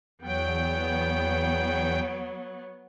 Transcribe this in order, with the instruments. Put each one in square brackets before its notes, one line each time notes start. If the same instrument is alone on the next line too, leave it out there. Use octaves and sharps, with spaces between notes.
[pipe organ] E2 G5 [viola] F#3 B3